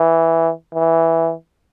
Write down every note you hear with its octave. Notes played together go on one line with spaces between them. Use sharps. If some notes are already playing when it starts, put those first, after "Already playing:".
Already playing: E3
E3